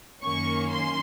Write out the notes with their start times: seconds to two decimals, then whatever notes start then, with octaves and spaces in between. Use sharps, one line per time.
0.22 F#2 D#3 A#3 C#4 C#6
0.71 C6